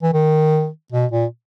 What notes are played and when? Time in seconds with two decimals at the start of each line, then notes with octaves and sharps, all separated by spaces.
0.03 E3
0.13 D#3
0.92 B2
1.12 A#2